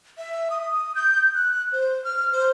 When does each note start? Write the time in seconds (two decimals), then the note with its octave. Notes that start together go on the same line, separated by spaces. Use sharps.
0.18 E5
0.50 D#6
0.95 G6
1.35 F#6
1.73 C5
2.04 F6
2.33 C5